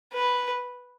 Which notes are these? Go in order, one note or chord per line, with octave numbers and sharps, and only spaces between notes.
B4